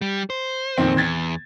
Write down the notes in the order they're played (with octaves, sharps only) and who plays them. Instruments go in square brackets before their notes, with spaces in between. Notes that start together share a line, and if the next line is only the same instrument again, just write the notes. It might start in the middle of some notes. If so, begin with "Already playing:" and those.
[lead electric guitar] G3
C5
[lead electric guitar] F2 [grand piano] A#2 D#3 C4
[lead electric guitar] E2 [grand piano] G#6 A6